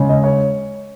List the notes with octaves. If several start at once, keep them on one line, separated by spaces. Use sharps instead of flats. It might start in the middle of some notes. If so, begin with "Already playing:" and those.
Already playing: C#3 G#3 C#4
D#5
C#5